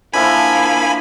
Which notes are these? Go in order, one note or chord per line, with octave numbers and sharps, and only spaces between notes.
D3 F3 A#3 E4 G#5 B5